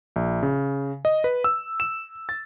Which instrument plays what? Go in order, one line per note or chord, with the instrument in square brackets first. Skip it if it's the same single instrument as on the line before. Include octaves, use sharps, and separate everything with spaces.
[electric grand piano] A#1
C#3
D#5
B4
E6
E7
A6